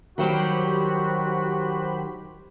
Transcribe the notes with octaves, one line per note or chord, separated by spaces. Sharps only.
D#3 F#3 G3 F#4 G4 C5 B5